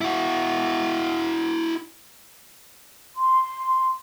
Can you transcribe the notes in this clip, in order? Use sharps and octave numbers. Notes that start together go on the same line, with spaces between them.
E4 F#4
C6